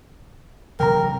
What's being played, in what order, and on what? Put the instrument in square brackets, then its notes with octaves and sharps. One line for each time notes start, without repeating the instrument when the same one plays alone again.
[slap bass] C3 E3 F#3 [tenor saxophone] A#4 [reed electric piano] G5 A#5